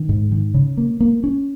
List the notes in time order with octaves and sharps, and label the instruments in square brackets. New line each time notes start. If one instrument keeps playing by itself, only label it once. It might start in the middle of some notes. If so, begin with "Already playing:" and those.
Already playing: [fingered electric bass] D#3
G#2
D#3
C#3
A#3
A#3
C#4